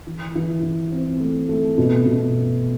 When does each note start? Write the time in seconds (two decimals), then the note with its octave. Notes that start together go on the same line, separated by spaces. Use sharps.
0.07 E3
0.35 E3
0.63 E3
0.92 C4
1.20 A3
1.49 A3
1.78 B2
2.05 B2